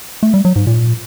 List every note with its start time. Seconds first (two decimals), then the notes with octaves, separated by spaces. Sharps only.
0.23 A3
0.34 G3
0.45 F#3
0.56 G#2
0.67 A#2